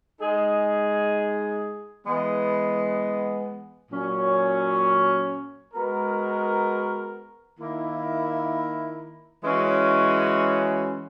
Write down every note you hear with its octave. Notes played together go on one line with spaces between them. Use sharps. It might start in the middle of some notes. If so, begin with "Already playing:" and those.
G#3 D#4 G#4
E3 G#3 B3
A#2 F#3 C#4
G#3 B3 F#4 A#4
D#3 A#3 E4 A#4
E3 G#3 C#4 F#4